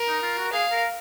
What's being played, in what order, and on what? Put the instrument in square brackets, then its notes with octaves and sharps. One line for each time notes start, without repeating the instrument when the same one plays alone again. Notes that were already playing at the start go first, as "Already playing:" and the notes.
Already playing: [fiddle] A#4
[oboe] D#4
F4
F#4
[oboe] G#4 [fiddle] F5
[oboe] A#4